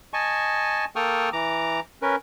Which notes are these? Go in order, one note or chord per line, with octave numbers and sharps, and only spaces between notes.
D#5 G#5 A5 C#6
A#3 A4 G5 C#6 D#6 F6
E3 A#5 D6
C#4 A#4 B4